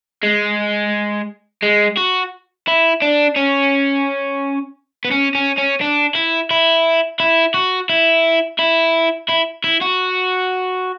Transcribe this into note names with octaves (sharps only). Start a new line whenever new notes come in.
G#3
G#3
F#4
E4
D4
C#4
B3
C#4
C#4
C#4
D4
E4
E4
E4
F#4
E4
E4
E4
E4
F#4